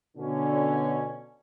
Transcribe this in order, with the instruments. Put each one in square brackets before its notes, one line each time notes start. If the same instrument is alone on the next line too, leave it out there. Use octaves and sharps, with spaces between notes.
[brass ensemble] B2 D3 C#4